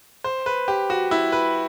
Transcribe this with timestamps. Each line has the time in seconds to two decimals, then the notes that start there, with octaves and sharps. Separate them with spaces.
0.24 C5
0.46 B4
0.68 G4
0.90 F#4
1.11 E4
1.32 B4